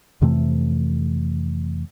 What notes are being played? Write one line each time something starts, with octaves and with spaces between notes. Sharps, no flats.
F2 C3 E3 A3